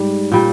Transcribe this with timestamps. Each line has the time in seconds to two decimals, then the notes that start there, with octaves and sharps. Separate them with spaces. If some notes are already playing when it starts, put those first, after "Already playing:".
Already playing: G#2 G3
0.32 A#2 G3